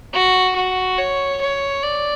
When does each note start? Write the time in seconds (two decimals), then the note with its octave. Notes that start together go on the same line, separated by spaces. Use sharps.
0.14 F#4
0.56 F#4
0.98 C#5
1.41 C#5
1.83 D5